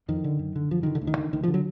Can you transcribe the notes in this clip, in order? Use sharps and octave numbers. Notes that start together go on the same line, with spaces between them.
F2 D#3
D3
F#2
D3
F#2 F3
D3 D#3
D3
D2
D#3
D3
D2 D#3
F3
D3
F#3